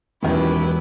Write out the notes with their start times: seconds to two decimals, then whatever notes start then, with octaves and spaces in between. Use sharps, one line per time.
0.23 E1 F#2 D#3 E4 G4 B4